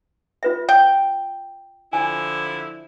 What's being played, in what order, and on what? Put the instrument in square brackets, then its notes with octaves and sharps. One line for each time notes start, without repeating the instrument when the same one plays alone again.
[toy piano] F4 B4 E5
[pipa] G5
[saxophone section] D3 F3 E4 [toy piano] G#5